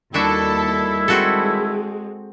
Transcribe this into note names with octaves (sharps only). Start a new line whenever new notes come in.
D#2 D#3 G3 D4 E4 F#4 A4 E5
G#3 C4 F#4 A4